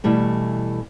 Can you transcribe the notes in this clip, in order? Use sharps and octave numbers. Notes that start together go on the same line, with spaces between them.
B2 E3 G3 A3